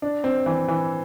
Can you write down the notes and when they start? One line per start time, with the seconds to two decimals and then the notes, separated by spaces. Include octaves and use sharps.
0.02 D4
0.24 C4
0.46 E3
0.68 E3